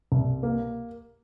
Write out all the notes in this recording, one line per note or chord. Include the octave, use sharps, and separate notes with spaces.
C2
A#3